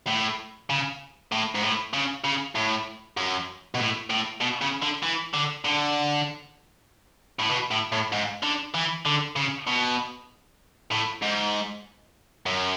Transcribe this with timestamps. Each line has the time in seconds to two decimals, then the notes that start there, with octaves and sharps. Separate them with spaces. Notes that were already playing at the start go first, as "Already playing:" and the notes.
0.08 A2
0.70 C#3
1.32 A2
1.55 G#2
1.62 A2
1.93 C#3
2.24 C#3
2.55 A2
3.17 F#2
3.75 B2
3.79 A2
4.10 A2
4.41 B2
4.62 C#3
4.83 D3
5.03 E3
5.34 D3
5.65 D3
7.39 A2
7.50 B2
7.71 A2
7.92 A2
8.12 G#2
8.43 D3
8.75 E3
9.06 D3
9.36 C#3
9.67 B2
10.91 A2
11.22 G#2
12.46 F#2